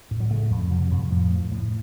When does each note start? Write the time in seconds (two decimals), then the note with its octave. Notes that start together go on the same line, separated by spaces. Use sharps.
0.11 A2
0.20 F#3
0.31 C#3 A3
0.50 F2
0.71 C3 F#3
0.91 F2
1.10 A2 F3
1.30 A2
1.51 A2